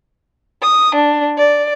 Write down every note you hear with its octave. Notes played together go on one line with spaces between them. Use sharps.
D#6
D4
D5